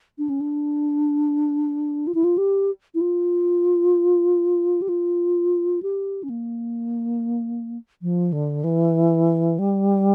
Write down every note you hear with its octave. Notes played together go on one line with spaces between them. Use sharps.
D4
C#4
D4
F4
E4
F4
G4
E4
F4
G4
F4
G4
C#4
A#3
F3
D3
E3
G3